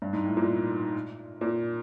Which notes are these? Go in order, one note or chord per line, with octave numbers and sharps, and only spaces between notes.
G2
G#2
A2
A#2
A#2